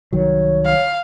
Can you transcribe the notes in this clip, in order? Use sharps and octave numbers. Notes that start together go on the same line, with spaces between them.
C2 D#3 F#3 C#5
F5